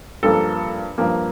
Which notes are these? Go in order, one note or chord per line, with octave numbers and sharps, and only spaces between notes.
G2 F3 A#3 A4
G2 F3 A#3